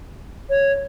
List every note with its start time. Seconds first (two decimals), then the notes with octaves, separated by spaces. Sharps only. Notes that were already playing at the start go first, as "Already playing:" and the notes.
0.50 C#5